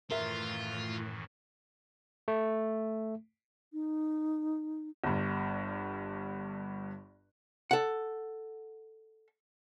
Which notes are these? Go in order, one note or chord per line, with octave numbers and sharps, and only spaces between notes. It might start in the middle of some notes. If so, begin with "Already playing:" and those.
F#2 A2 D#3 E3 F4 A#4 E5
A3
D#4
G1 G2
A4 F#5